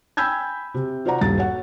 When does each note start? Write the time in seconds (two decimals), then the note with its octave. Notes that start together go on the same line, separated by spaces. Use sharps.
0.17 G5 G#5 B5 E6 G6 G#6
0.74 C3
1.05 F4 F#4 C5 D5 F#5 A#5
1.21 D#1 G2 A6
1.37 F#4 C#5 F#5